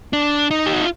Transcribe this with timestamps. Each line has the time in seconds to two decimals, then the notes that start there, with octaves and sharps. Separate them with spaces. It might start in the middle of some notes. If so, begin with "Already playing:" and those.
0.13 D4
0.51 D#4
0.66 G4
0.73 F#4
0.81 F4